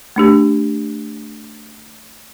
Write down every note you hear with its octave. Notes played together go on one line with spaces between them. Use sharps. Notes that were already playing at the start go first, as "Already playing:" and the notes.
A3 D4 G4